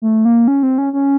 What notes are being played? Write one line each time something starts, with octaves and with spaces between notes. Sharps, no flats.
A3
A#3
C#4
C4
C#4
C#4